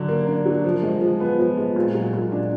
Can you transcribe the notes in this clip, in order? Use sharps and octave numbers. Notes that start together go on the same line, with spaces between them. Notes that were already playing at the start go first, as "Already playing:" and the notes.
Already playing: D3 F#3 D4
A#3
D4
F#3
F3
G#3
F3
B3
F3
G#3
A#2
F#3
A#2
D4